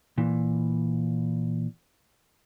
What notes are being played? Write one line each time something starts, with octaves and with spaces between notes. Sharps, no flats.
A#2 E3